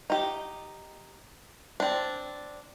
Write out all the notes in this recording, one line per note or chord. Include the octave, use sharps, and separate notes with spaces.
D#4 G4
C4 D4